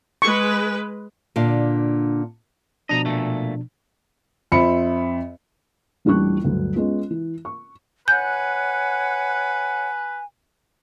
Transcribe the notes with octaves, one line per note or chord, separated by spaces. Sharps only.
G#3 B4 C#6
A#2 D3 D4 F5
B2 F3 D4 D#5 A#5
A#2 A3
F2 C4 E5 B5 C#7
D#1 A1 G3 D4 C#6 F#6
D2 G2 F#3
G#3 B3 C#4 F4
E3
C#6
B4 C#5 F#5 G#5 G6